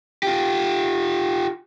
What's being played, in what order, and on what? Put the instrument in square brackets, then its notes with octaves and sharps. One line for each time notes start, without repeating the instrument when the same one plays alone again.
[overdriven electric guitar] F4 G4